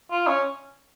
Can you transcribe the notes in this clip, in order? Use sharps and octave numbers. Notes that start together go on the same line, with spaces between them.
F4
C#4